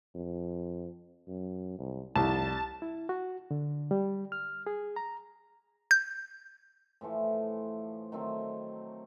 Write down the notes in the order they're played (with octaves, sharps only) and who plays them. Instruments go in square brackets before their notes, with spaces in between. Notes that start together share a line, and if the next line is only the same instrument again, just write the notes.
[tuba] F2
F#2
C2
[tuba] F1 [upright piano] C2 [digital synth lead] A5
[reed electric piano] E4
F#4
D3
G3
F6
G#4
A#5
[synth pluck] G6
[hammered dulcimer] A2 E3 F3 A3
D#3 F#3 A3 C4